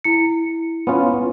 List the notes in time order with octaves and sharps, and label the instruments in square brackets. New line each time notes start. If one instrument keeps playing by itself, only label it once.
[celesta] E4 C#7
[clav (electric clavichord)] B3 C#4 F4